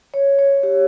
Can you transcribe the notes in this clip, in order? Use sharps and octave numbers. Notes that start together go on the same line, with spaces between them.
C#5
C#5
G4